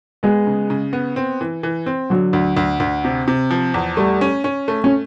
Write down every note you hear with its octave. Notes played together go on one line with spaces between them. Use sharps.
G#3 B3
C#3
C#3
B3
C4
E3
E3
C4
D3 F#3
D2
D2
D2
C3
C3
F3
E2
G3 A3
C#4
C#4
A3
C#4